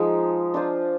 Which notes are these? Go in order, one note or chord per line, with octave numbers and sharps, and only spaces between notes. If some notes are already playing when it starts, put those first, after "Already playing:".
Already playing: F3 G#3 D#4
D4 F4 C5